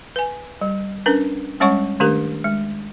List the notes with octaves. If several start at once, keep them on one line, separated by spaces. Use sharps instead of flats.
B4 G#5
G3
C#4 D4 A#4 B4
G3 G#3 C#4 C#5 F#5 C#6
D#3 A3 D4 G4 A#4
G#3